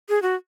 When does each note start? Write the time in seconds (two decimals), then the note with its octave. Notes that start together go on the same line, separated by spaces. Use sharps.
0.09 G#4
0.22 F#4